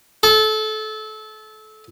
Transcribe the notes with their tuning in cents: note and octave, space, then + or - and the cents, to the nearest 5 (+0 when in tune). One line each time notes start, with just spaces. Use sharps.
A4 -25